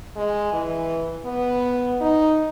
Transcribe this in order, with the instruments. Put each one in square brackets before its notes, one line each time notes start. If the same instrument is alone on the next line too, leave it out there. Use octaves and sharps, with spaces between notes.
[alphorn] G#3
E3
B3
D#4